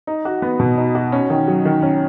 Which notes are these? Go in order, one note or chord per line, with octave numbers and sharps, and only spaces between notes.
D#4
F#4
B3
B2
D#4
F#4
C#4
D#3
F#3
D#3
C#4